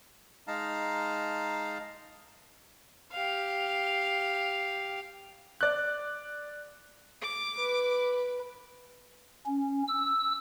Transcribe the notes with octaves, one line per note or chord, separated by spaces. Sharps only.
G#3 D#4 F5 A5 A#5
G4 F5
D5 F#6
D6
B4
C#4
E6